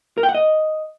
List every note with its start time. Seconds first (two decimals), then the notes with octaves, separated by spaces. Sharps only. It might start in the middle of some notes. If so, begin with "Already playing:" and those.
0.18 A#4
0.23 G5
0.29 F#5
0.34 D#5